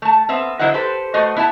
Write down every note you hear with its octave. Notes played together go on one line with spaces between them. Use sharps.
A3 A5
B3 C4 E5
D3 F#3 E4 C5 D#5 F#5
G4 A4 B4 C5
A3 F#4 C5 D#5
B3 E4 E5 A5